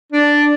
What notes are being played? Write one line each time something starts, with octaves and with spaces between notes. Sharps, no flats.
D4